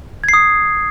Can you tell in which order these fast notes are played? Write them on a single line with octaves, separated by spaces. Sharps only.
G#6 C7 D#6